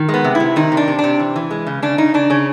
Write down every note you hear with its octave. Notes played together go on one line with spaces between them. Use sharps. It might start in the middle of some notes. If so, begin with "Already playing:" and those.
Already playing: D#3
G#3
B3
C3
E4
C3
D#3 D#4
C3
D4
C3
D4
C3
E3
E3
G#3
C#3
C#3 D4
C#3 D#4
C#3 D4
C#3 C#4